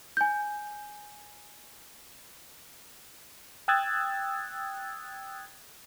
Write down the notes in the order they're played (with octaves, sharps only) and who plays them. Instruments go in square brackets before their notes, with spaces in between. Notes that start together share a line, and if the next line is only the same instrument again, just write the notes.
[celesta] G#5 G6
[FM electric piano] G5 D#6 E6 F#6 G#6 A6